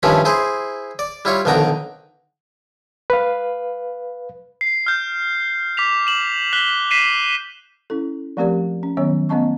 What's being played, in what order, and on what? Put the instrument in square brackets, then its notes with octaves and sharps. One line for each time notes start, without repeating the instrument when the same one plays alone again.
[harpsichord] G2 C3 D#3 F3 C#4 E4
E4 G#4 C5 C6
D5
G3 E4 F4 C#5
B1 F2 D3 D#3 G5 A#5
[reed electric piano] B4 F5
[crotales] C7
F6 G6
D6 B6 F7
E7 F#7
F#6 B6 G7
B6 C7 D#7 E7
[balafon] C#4 E4 A4
F3 A3 C4 G4 A#4 D5
C#4
D#3 F#3 B3 C#4 C#5
A3 B3 C#4 D#5 A5 C#6